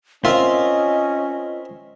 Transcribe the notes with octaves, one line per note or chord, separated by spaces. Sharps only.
C4 C#4 F4 A#4 D#5 E5